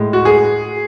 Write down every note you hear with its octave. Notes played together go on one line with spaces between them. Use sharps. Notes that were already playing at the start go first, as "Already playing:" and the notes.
Already playing: A2 G#3
F#4
G#4